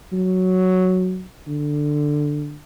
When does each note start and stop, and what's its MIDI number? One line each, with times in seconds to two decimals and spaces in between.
0.13 1.23 54
1.48 2.59 50